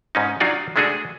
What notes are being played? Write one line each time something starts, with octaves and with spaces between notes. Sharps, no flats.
G#2 C#4 D#4
F#3 D4 D#4 F4 F#4 D5
G#3 A3 D4 F#4 G#4 A4